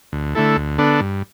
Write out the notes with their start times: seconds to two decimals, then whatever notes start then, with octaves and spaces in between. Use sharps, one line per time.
0.12 D2
0.35 D3 A3 E4 A4
0.57 D2
0.78 D3 B3 D4 A4
1.01 G2